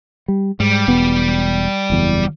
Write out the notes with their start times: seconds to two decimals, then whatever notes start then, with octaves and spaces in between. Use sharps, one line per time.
0.28 G3
0.60 G#2 G3
0.88 E1 B3
1.90 F#1 E2